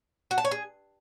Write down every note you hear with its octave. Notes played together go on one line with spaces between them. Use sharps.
F#4
A5
C#5
G#4